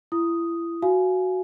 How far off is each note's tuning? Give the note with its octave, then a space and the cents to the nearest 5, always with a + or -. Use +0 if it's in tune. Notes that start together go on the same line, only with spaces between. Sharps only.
E4 +35 D#6 +0
F#4 +0 F5 -20 G#5 +20